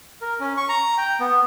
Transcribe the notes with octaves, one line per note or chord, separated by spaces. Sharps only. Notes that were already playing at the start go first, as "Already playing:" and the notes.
A#4
C#4
C#6
A#5
G5
B3